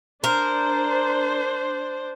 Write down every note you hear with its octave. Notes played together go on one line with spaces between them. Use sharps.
D4 A#4 C5